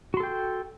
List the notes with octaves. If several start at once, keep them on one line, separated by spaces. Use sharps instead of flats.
F#4 A4 G5 C6